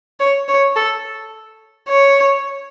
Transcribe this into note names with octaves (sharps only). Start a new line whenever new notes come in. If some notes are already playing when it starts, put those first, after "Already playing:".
C#5
C#5
A4
C#5